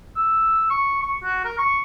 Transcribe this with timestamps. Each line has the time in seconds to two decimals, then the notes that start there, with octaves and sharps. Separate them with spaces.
0.16 E6
0.70 C#6
1.02 C#6
1.24 F#4
1.44 A#4
1.58 C#6